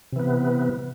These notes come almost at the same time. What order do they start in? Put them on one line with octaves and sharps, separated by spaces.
C3 E3 B3